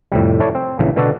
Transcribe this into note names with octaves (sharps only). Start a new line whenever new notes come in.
F2 A2 C3 G3
E4 A4 C#5 D5
C4
A#1 C#3 E3
B2 D3 B3 F#4 A4 D5